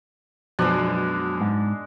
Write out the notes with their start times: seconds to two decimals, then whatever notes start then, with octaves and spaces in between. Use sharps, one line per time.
0.59 F#2 B2 F3 G#3 D4
1.41 G#2